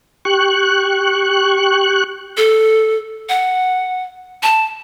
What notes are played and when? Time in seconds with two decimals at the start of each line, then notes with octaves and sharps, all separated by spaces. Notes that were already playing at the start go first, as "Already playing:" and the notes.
0.25 G4 C#6 F#6
2.37 A4
3.29 F#5
4.43 A5